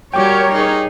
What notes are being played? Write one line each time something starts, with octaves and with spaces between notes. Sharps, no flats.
G3 F#4 G4 A#4 C#5 G5 D6
D#4 G#4